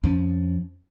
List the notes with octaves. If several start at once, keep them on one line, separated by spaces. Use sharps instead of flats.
F2 F3 C#4